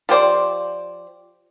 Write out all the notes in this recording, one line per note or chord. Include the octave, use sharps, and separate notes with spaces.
F3 G4 C5 D5